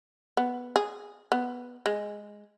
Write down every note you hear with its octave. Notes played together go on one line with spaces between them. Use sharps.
B3
G#4
B3
G#3